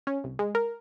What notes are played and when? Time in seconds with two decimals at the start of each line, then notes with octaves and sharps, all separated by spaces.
0.07 C#4
0.24 C2
0.39 G#3
0.55 A#4